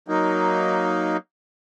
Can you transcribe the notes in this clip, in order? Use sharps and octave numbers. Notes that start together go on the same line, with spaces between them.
F#3 A#3 D#4